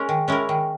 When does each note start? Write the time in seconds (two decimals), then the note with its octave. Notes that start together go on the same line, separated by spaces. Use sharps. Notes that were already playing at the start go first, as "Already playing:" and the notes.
Already playing: G#3 C#4 A#4
0.09 D#3
0.28 G#3 C#4 E4 A#4
0.49 D#3